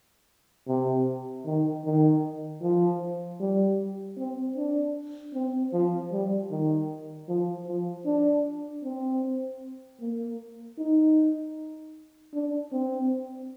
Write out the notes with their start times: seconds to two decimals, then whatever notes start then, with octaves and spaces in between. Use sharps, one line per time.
0.68 C3
1.46 D#3
1.85 D#3
2.62 F3
3.40 G3
4.18 C4
4.57 D4
5.34 C4
5.73 F3
6.12 G3
6.51 D#3
7.29 F3
7.68 F3
8.06 D4
8.84 C4
10.01 A#3
10.78 D#4
12.34 D4
12.72 C4